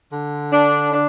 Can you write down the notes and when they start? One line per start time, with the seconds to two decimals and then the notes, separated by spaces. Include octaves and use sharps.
0.11 D3
0.52 D4
0.92 D4